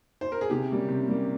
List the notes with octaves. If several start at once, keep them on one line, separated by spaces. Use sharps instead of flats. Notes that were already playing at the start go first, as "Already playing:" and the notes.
C5
A#4
G#4
C3 G4
G3 A#3 C#4
C3
G3 A#3 C#4